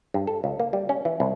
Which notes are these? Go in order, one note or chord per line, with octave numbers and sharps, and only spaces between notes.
G2
A4
C#2
A#3
G3
C#4
E3
C2